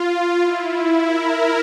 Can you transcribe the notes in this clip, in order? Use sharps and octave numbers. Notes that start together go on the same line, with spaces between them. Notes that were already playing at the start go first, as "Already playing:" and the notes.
Already playing: F4
E4
A#4